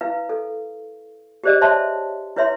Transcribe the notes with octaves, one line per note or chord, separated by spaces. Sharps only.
E4 B4 F5
A4
G4 G#4 C5 D5 D#5
C5 C#5 D#5 E5 A5 C6
E4 B4 C#5 E5 C6